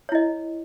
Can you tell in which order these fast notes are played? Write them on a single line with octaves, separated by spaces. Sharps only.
C#5 E4 D#5